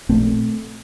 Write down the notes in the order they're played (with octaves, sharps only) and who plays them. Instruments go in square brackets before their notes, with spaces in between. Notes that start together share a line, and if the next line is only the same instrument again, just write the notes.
[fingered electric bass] A#1 A#2 A3 C4